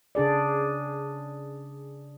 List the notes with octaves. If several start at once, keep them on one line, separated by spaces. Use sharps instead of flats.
C#3 D4 G#4 D5